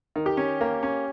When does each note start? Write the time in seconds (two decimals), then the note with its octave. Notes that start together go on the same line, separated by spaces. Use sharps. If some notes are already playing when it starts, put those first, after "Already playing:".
0.16 D#3
0.26 G4
0.37 C#4
0.61 A#3
0.83 C#4